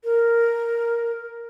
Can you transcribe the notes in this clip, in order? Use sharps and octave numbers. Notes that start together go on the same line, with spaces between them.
A#4